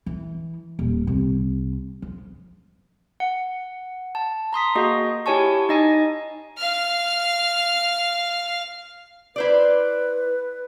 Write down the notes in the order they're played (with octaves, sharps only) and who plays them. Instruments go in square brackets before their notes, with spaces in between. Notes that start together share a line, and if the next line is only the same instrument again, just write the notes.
[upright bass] E3
D#1
C2
F3
[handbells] F#5
A5
A#5 C6 D#6 B6
A#3 F#4 G#4 D#5
E4 G4 C#5 G#5 A5 C#6
D#4 D#5 G#5
[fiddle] F5 F6
[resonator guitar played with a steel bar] E4 C5 D5 [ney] B4